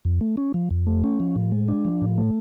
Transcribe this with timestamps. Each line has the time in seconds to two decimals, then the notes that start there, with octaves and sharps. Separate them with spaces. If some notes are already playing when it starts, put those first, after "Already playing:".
0.05 F2
0.21 A3
0.37 C#4
0.54 F3
0.71 F2
0.87 A3
1.04 C#4
1.20 F3
1.36 A2
1.52 G#3
1.68 D4
1.85 F3
2.02 A2
2.18 A3